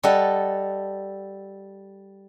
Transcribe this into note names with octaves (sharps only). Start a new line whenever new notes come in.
G3 A4 D#5 F#5